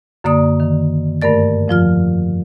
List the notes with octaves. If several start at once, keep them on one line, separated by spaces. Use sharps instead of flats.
F#2 D3 A#3 D5 D#6
D#3
G2 A3 A#4 D5 A6
F2 F3 F4 F6